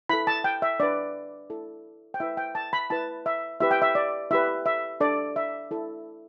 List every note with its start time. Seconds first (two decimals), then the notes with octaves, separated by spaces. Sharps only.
0.09 E4 A4 B5
0.27 A5
0.44 G5
0.62 E5
0.80 D4 B4 D5
1.50 E4 A4
2.14 G5
2.20 E4 B4 E5
2.37 G5
2.55 A5
2.73 B5
2.90 E4 B4 A5
3.26 E5
3.60 E4 G4 B4 E5
3.71 G5
3.82 E5
3.95 D5
4.31 E4 G4 B4 E5
4.66 E5
5.00 D4 A4 D5
5.36 E5
5.71 E4 A4